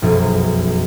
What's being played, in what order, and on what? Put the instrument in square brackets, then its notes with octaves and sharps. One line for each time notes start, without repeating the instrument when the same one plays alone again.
[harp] F1 B1 F#2 G#4